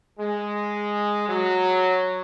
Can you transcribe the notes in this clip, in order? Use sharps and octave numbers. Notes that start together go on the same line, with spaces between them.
G#3
F#3